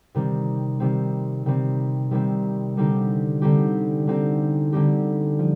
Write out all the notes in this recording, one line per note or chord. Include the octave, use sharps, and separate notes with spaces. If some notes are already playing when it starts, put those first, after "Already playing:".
C3 D#3 G3 C4
C3 D#3 G3 C4
C3 D#3 G3 C4
C3 D#3 G3 C4
D3 G3 C4 D#4 G4
D3 G3 C4 D#4 G4
D3 G3 C4 D#4 G4
D3 G3 C4 D#4 G4
F3